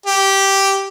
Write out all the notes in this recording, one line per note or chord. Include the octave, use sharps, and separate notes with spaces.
G4